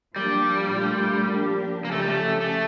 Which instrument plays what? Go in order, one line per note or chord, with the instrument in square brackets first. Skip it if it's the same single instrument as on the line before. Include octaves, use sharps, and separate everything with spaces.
[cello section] F3 A#3 D4 G4 [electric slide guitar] G3
[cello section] A#2 A3 D4 F4
F3 A#3 D4 G4
[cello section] C#3 F3 C#4 G4 [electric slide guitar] A#3
[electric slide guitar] A3
G3
A3
A3